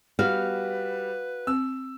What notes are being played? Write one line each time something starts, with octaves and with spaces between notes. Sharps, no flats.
G3 F#4 B4 F5
C4 E6